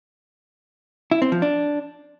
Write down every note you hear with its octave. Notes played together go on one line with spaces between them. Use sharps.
E4
C4
F3
D4